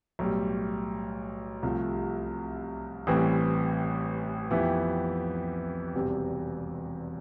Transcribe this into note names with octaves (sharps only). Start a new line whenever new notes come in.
B1 A2 G3
C2 C3 F3 A3
A1 A2 E3 G3 C4
F2 E3 B3 E4 G4
E1 E2 C3 G3